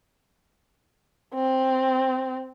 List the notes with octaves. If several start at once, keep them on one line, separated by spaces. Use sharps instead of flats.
C4